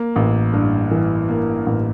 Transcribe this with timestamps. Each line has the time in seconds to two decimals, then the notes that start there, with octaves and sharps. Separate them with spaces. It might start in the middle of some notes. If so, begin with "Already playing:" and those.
Already playing: A#3
0.16 A1
0.53 G2
0.91 E3
1.29 A#3
1.66 A1